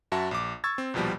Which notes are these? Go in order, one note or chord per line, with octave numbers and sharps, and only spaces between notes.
F#2 F#4 E5 A5
A#1 D6
C#6 E6 G#6 A6
C4
A#1 D#2 B2 F3 G3